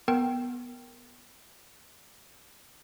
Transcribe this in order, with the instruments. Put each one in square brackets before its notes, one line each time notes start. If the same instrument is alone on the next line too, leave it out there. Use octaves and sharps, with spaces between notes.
[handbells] B3 A#4 G5